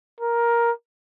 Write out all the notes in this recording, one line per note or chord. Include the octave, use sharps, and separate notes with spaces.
A#4